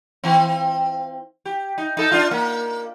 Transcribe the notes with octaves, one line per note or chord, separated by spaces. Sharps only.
E3 C4
G4
D#4
D#4 A4
D4 F4
A#3